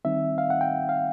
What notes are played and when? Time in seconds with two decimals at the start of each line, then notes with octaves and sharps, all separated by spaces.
0.05 D#3 G3 C4 D#4 E5
0.38 F5
0.50 F#5
0.61 G5
0.89 F5